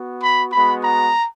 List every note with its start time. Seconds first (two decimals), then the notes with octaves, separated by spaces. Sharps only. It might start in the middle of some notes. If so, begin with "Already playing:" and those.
Already playing: B3 F#4
0.22 B5
0.52 G#3 B3 F#4 B5
0.83 A#5